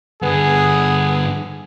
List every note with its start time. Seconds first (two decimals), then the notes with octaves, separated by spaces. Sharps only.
0.23 G2 D3 B3 G#4